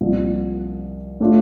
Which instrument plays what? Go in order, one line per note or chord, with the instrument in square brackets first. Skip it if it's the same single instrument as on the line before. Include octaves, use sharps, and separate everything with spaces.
[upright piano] C2 A#2 F3
A2 A3 D4 F4